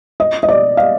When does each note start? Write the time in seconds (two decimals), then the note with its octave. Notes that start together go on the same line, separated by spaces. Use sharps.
0.20 D#5
0.43 D#5
0.49 D5
0.77 F5